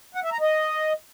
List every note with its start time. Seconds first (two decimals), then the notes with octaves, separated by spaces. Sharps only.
0.15 F#5
0.23 E5
0.32 A#5
0.40 D#5